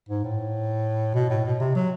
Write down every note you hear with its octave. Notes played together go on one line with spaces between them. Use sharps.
G#2
A2
B2
A2
B2
C3
F#3